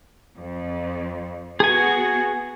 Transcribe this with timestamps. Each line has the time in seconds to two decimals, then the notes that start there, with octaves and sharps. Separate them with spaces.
0.39 F2
1.60 B3 F#4 G#4 G#5